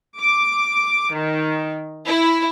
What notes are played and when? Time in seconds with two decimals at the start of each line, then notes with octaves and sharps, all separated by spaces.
0.20 D6
1.14 D#3
2.07 E4